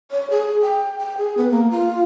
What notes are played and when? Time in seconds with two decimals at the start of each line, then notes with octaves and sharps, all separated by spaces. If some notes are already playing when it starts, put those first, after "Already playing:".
0.11 C#5
0.30 G#4
0.62 G5
0.99 G5
1.18 G#4
1.37 B3
1.51 A#3
1.71 F4